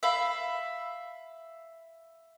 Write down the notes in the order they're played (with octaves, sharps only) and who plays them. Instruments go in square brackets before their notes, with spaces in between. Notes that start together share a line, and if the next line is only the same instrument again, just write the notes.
[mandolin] E5 F5 B5